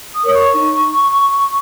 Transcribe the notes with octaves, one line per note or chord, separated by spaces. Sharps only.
D#6
A#4 C#5 D#6
C#6
D#4